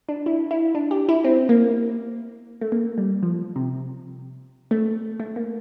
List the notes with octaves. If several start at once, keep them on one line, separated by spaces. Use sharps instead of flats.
D4
E4
E4
D4
G4
E4
C4
A#3
A3
A#3
G3
F3
C3
A3
A3
A#3